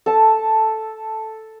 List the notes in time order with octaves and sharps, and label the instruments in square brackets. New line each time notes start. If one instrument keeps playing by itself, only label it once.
[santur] A4 A5